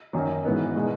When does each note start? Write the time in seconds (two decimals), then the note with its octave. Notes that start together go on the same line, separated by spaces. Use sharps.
0.13 F#2 D#3 F#3
0.44 G#2 E3 B3 D#4
0.75 B2 G#3 D#4